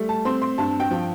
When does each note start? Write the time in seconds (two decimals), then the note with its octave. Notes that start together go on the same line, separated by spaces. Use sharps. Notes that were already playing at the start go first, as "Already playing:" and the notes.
Already playing: G3 A3
0.09 A5
0.25 C4 C6
0.42 C6
0.58 G2 A5
0.80 G5
0.91 F3